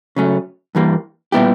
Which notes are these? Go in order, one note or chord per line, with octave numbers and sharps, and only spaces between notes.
C#3 F#3 A3 C#4
G2 E3 G3 A#3
A#2 G3 B3 E4 G4